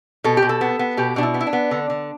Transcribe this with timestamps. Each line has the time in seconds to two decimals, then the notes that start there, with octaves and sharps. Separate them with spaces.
0.24 B2 A4
0.37 G4
0.42 B2
0.49 A4
0.61 B3
0.79 B3
0.97 B2 G4
1.16 B2 D4
1.23 E4
1.34 B3
1.41 E4
1.47 D4
1.53 B3
1.71 D3
1.90 D3